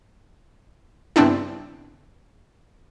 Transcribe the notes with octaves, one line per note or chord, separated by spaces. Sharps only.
G2 C#3 B3 C4 D4 E4